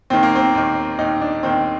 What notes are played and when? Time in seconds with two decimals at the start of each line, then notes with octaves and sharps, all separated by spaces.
0.10 D#2 D#3 C4
0.23 A#3
0.35 C4
0.55 D#2 D#3
0.99 D#2 D#3 D#4
1.21 D4
1.43 D#2 D#3 C4